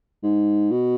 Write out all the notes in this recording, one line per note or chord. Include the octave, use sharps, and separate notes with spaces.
G#2
B2